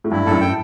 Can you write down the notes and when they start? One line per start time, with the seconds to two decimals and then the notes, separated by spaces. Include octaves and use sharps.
0.04 A2
0.11 G2 E4
0.26 G2 A4
0.31 F#2 A2
0.41 G5